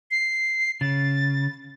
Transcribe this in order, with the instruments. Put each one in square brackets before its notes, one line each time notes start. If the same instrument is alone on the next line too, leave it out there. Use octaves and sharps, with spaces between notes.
[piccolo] C7
[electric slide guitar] C#3 [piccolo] A6